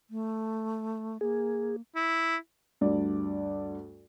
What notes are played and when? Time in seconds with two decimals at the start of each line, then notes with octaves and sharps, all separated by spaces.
0.10 A3
1.21 A#3 G#4
1.95 E4
2.81 D2 G2 D5